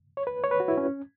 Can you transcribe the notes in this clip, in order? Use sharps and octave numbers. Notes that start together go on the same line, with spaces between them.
C#5
B4
C#5
B4
F#4
E4
C#4